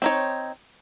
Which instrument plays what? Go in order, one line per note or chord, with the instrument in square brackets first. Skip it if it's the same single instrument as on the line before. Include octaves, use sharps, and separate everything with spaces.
[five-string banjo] C4 D#4 C#5